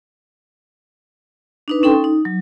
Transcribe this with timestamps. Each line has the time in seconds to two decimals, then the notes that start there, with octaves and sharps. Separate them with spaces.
1.68 D4 D#4 B4
1.83 C#4 D#4 A4 G5 C6
2.04 D#4
2.25 F#3